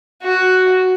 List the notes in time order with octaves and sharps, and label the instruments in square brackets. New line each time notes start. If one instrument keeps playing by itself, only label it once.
[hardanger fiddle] F#4